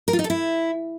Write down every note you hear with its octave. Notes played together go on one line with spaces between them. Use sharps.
A#4
F4
D#4
A4
E4